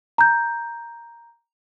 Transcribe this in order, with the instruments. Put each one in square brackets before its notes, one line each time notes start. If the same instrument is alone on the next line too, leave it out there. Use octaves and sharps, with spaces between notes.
[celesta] A#5 G6